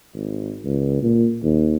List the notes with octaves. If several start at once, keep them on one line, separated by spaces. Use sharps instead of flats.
G#1
C#2
A#2
D#2